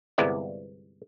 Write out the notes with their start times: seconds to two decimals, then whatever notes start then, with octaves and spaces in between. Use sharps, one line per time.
0.18 G1 C2 G#3 B3 E4 D5